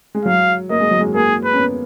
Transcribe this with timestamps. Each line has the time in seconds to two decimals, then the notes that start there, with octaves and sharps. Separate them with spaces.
0.15 G#3
0.25 F#3 F5
0.70 A#3 D#5
0.80 G#3
0.91 F#3
1.01 G#3
1.15 A#3 G#4
1.44 B4
1.53 C#4
1.59 B3